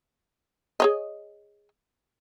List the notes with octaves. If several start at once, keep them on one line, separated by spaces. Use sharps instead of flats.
G#4 C#5 D#5